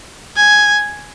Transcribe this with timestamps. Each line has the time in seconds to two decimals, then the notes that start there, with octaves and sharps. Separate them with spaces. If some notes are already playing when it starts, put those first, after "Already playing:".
0.36 G#5